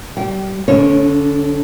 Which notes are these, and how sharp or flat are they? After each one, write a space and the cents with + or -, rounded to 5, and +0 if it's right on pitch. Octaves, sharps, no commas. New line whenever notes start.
G3 -30 G5 -20
D3 -10 C#4 +35 C#5 -15